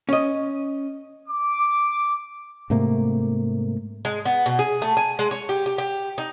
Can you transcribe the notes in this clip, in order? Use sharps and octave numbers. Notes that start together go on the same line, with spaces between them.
C#4 D#5
D6
G#2 C3 A3 A#3
G#3
B3
B2
G#4
A3
G#5
G#3
C#5
G4
G4
G4
D#4